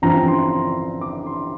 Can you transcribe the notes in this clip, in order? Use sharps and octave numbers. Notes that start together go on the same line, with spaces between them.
A1 G2 F3 C4 A#5
C6
C6
D6
C6